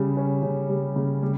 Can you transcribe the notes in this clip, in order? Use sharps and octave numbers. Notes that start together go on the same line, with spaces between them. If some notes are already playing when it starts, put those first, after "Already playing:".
Already playing: C#3 G3
C#4
C#3
G3
C#3
G3